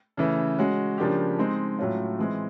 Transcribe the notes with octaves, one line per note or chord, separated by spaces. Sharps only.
C#3 E3 A3
G#3 C#4 F#4
C#3 F3 A#3 D4 G4
G#3 C4 D#4
A2 F#3 A3 C#4 F4
E3 G#3 C4